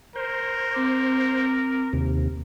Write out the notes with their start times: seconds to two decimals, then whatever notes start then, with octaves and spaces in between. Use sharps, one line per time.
0.16 A#4 C5
0.74 C4 D6
1.93 D#2 C3